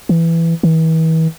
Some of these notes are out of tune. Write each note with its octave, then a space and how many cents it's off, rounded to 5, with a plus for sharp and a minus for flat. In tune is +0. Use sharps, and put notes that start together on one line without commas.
E3 +10
E3 -40